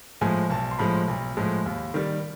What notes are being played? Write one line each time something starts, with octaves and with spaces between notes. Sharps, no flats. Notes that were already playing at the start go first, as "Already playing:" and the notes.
A2 F3 G#3 G#5
B1 A5
C6
A2 F3 G#3 B5
B1
A2 F3 G#3
D#2
D#3 G3